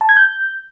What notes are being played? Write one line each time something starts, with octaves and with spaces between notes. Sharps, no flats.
A5
G#6
G6